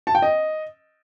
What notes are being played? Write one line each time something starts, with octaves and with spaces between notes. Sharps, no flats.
A5
G5
D#5